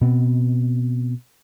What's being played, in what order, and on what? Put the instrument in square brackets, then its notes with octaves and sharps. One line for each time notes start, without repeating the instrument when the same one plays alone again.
[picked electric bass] B2 B3 C4